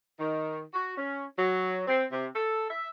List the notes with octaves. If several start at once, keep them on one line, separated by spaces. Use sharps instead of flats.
D#3
F#4
C#4
F#3
C4
C3
A4
E5